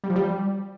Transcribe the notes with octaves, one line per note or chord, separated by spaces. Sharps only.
G3
F3
G3